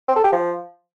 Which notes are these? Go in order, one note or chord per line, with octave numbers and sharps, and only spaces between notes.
C4
A4
G4
F3